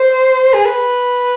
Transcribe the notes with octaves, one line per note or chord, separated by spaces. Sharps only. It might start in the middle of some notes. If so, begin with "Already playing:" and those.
Already playing: C5
G#4
B4